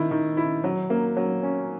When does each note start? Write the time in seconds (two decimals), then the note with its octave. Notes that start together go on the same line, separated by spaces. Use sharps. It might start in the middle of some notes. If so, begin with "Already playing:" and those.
Already playing: D#3 E4
0.11 D#3
0.37 E4
0.64 F#3
0.90 A#3
1.16 F#3
1.43 C#4